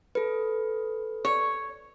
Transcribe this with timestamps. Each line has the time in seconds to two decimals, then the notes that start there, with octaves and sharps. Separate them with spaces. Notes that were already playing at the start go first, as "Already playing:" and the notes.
0.15 A4 B4
1.25 C#5